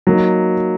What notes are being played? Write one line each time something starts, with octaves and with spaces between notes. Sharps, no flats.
F#3 A#3 D#4